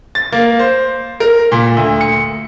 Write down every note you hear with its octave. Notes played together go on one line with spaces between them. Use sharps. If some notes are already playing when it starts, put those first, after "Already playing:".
A6
A#3
C5
A#4
A#2
D2
C#7